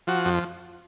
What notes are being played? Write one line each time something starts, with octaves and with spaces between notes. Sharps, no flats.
F3 F#4
F2